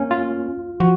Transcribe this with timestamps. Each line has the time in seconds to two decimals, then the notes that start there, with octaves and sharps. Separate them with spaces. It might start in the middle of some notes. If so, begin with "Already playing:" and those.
Already playing: A#3 C#4
0.11 F4
0.80 F3 F#4